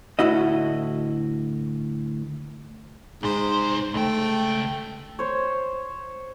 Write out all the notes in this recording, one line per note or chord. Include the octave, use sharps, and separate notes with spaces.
D2 A2 E4 F#4 D#5
C2 G#2 C5
C#2 A3 G5
C5 C#5